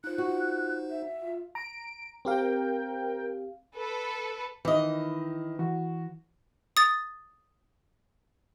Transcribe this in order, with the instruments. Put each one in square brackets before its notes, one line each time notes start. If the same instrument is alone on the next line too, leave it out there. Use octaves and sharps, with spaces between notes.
[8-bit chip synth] D#4 C5 [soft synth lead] F4 [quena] F#6
[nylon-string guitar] F#4
[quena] E5
[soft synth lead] F4
[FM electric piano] A#5 [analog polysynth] D7
[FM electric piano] C4 G4 F5 [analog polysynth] A#4 G5
[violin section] A4 B4
[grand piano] D#3 [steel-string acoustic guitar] E3 D#5
[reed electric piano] E3 [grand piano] F#4
[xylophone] D#6 A6